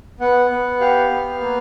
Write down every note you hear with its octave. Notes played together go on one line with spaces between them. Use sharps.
B3 F#5
B3
G4 F5
B3
A#3